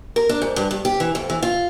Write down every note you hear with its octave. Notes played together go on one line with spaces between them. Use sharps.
A#4
D4
G#2
G2
G2
G4
E3
F2
E3
F4